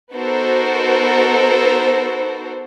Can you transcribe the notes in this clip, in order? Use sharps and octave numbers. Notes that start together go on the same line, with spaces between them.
B3 D#4 F#4 A4 A#4 C5